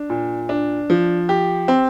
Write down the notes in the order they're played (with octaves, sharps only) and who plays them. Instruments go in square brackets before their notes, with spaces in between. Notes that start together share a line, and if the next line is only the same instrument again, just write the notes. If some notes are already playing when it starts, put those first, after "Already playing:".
Already playing: [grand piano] D4
A#2
D4
F3
G4
C4